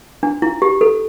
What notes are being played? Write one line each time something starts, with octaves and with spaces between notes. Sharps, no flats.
D4
E4
G4
A4